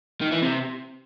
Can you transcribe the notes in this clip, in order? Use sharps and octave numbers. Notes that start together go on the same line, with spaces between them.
D#3
E3
C3